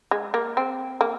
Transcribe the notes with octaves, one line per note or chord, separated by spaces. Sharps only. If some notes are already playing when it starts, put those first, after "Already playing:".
G#3
A#3
C4
A#3